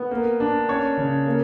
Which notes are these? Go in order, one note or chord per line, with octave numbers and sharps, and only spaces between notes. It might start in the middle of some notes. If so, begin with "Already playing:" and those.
Already playing: B3
A#3
D4
C#4 C#5
C#3
A#3